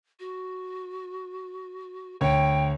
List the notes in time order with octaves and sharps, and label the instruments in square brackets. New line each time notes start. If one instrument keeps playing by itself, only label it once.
[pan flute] F#4
[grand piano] D2 C#5 [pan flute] G5